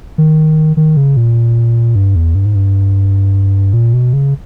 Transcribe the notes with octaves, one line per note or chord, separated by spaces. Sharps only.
D#3
D#3
C#3
A#2
G2
E2
G2
G#2
G2
A#2
B2
C#3